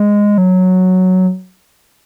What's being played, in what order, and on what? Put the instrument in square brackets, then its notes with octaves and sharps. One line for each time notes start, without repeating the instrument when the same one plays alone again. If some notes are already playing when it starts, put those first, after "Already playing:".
Already playing: [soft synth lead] G#3
F#3